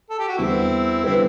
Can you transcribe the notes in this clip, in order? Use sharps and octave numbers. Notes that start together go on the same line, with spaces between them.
A4
G4
F#4
E2 D3 G3 B3 C4 E4
D3 G3 B3 C4 E4